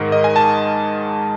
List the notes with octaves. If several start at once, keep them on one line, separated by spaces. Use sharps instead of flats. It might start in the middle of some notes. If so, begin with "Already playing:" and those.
Already playing: G#2 D#3 G#3 A#4
D#5
G#5
A5